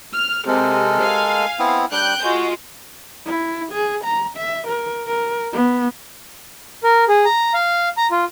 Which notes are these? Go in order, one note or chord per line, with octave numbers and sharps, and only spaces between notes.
F6
C3 G#3 A4 A#4
F5 G#5
B3 C4 E4
G3 D4 G5 F#6 G6
G#3 F4 F#4
E4
G#4
A#5
E5
A#4
A#4
B3
A#4
G#4
A#5
F5
A#5
F4